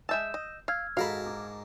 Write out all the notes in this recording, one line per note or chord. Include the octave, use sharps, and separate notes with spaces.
G#3 E5 A5 E6 G6 E7
D#5
F5 E6 F6 G#6
G#2 F#4 A4 A#4 F5 A5 B5
D6